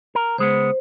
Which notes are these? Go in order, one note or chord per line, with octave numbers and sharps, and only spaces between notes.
A#4
C#2 G#3 B3 C5